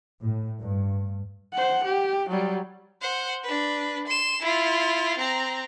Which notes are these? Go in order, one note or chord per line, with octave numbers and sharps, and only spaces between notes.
A2
G2
C5 F#5
G4
F#3 G3
C5 F#5
D4 B4
C6 E7
E4 F4
C4 A#5